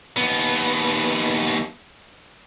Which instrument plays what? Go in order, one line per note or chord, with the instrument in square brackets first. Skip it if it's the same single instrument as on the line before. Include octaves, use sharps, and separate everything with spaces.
[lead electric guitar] D#2 B3